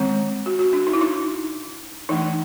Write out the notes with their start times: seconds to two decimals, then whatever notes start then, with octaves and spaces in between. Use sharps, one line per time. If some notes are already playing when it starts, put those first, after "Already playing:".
Already playing: D#3 G#3 C4
0.46 F#4
0.59 F#4
0.73 D4
0.87 D#4
0.93 E4
1.01 D#4
2.09 E3 A3 D4 D#4